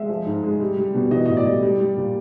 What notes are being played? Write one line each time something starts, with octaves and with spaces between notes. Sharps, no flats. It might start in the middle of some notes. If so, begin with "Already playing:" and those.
Already playing: G#3 E5
F3
G#2
G#3
G3
G3
B2
E3 D#5
A2 D#5
D5
G3
G3
G3
A#2